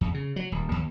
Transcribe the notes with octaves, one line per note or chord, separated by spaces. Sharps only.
E2
C#3
F#3
D#1
D#2